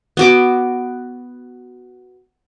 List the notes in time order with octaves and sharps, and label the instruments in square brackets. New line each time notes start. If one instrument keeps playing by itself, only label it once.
[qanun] B3 F#4 D6